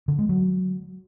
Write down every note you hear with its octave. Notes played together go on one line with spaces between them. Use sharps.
D3
G#3
F#3